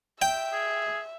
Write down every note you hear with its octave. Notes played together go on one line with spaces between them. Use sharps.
E5 G5
G#4